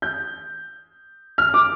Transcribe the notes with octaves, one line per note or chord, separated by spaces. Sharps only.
G6
F6
D6